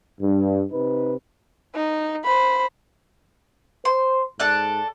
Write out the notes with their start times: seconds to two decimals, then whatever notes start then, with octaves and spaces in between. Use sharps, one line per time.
0.21 G2
0.72 C3 D#4 B4
1.75 D#4
2.24 C5 B5
3.85 C5 C6
4.40 G#2 A4 D5 F#6